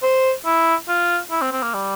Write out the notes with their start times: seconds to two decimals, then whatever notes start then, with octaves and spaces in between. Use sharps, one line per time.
0.03 C5
0.45 E4
0.88 F4
1.31 E4
1.42 C4
1.52 C4
1.63 A#3
1.74 G3